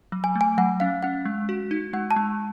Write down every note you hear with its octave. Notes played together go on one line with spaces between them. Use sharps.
F#3
G#5
A3
G#5
F#3 F#5
C#4 F5
C#4 F#5
G#3
F#4
D#4
G#3 F#5
A5
G#3